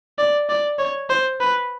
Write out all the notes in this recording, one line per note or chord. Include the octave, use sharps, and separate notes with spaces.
D5
D5
C#5
C5
B4